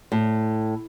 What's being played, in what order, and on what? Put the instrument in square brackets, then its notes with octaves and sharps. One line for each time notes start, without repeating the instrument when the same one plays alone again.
[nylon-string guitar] A2